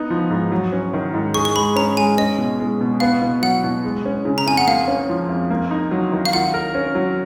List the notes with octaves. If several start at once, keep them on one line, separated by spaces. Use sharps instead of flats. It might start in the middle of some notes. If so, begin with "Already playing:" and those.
Already playing: B3 D#4
F3
G#2
F#3
C#4
D#3
G#2
G#4 C#6
C#6
G#3 B5
C#4 A#5
G#3 G#5
C#4 D#5
B2
G#3
B2
B3 F5
B2
F#3 F#5
B2
G#3
C#4
C#3
A#5
F2 G#5
F#5
A#3 F5
C#4
F3
F2
A#3
D#4
F#3
D#3
F5
F4 F#5
A#4
C#4
F#3